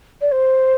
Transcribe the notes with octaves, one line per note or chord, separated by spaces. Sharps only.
D5
C5